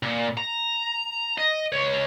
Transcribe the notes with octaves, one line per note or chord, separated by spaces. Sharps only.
A#2
A#5
D#5
C#2 C#5